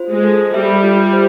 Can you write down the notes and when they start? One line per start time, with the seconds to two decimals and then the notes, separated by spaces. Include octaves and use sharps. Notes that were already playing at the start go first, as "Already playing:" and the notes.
Already playing: F4 C5
0.09 G#3
0.23 A4
0.54 G3 E5
0.83 F4
1.13 C5